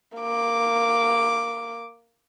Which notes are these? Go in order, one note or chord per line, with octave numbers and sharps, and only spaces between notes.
A#3 D6